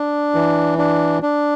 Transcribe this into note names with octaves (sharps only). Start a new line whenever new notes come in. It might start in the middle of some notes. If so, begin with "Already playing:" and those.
Already playing: D4
E3
D4
D4